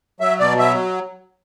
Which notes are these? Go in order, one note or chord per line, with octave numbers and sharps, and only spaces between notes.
F#3 E5
B2 D5
F#3 E5